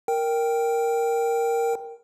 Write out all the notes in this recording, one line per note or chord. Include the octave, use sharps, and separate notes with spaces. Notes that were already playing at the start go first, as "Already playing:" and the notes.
A#4 G5